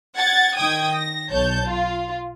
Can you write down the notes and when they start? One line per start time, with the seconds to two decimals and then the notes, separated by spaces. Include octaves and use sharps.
0.16 F#5 G#6 A6
0.57 D#3 G5 D#6 G#6
0.93 A#6
1.31 B1 C#5 A5 G6
1.65 F4